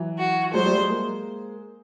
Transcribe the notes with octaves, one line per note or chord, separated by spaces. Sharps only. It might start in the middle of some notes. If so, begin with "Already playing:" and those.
Already playing: E3 F#3
F#4
F#3 G#3 C5
G3 A3
F#3 G#3
G#3 A#3